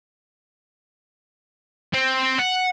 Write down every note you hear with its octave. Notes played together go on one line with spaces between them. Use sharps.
C4
F#5